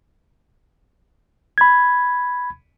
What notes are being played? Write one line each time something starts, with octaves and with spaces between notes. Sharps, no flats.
B5 G#6